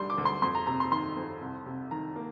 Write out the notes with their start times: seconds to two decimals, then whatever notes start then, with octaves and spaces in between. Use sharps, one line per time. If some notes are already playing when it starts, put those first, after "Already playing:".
Already playing: D2 D3 G3 C6
0.10 D6
0.18 D2
0.25 C6
0.42 F2 C6
0.55 A#5
0.67 C3 A#5
0.80 C6
0.92 D#3 C6
1.17 F2
1.41 C2
1.66 C3
1.91 D#3 A#5
2.16 A#3